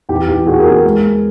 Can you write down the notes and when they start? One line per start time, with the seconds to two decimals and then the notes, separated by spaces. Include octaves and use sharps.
0.09 E2 G4
0.28 E2 G4
0.46 E2 F#4 G#4
0.59 G#4 A#4
0.65 E2
0.71 G#4 A#4
0.84 G#3
1.03 G#3